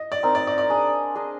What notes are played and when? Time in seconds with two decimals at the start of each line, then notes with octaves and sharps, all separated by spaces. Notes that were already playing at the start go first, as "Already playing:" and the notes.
Already playing: D#5
0.12 D5
0.23 C4 D#4 A#4
0.35 D5
0.47 D5
0.58 D5
0.70 D4 G#4 D#5
1.15 D4 G#4 D#5